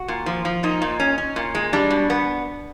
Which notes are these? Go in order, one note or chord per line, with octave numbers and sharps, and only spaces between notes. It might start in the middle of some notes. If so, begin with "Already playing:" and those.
Already playing: F#4
A#2
F3
F3
A#2 D#4
A#2
C#4
C#4
A#2
G#3
G3 D4
B2
B3